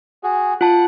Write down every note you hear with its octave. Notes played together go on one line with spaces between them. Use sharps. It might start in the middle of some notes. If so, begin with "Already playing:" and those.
F#4 G#4
F4 F#5 A5 F#6